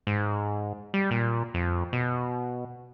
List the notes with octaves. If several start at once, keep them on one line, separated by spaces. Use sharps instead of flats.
G#2
G3
A#2
F2
B2